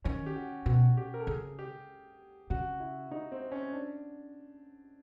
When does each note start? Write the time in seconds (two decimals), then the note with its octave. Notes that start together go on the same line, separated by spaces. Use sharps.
0.04 D#3 C#4
0.26 G4
0.36 F#4
0.66 B2 F#4
0.97 G4
1.14 A#4
1.21 A4
1.27 C#3 G#4
1.59 G4
2.50 C#3 F#4
2.80 E4
3.11 D#4
3.32 C4
3.52 C#4
3.73 D4